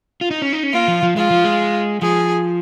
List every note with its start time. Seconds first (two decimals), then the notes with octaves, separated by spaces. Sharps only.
0.21 F4
0.31 D#4
0.42 C#4
0.53 D#4
0.63 C#4
0.73 A#3 F4
0.88 F3
1.03 F3
1.16 G#3 F4
1.31 F3
1.44 G#3
2.02 F3 G#4